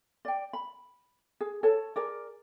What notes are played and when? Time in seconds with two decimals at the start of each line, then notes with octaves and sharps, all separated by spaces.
0.25 D5 G5
0.53 B5
1.41 G#4
1.63 A4 C#5 A5
1.96 G#4 A#4 D5